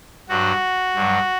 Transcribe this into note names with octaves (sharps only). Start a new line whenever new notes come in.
G2 F#3 F#4
G2 F#3